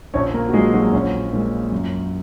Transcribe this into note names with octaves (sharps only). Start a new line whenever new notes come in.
A#1 C#4 C#5
A#3 A#4
F#4
A#2 F#3 G#3 G#4
F#3 F#4
A#1 C#4
A#2 G#3
F#2